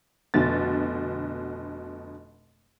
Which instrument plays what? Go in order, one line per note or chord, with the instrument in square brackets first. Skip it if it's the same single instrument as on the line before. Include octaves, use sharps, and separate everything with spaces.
[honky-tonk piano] F1 B2 D3 A6